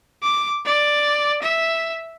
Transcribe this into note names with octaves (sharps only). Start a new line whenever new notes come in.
D6
D5
E5